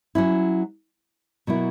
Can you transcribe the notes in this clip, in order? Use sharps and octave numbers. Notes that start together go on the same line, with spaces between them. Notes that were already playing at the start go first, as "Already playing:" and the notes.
F#3 C#4 E4
B2 F#3 A#3 E4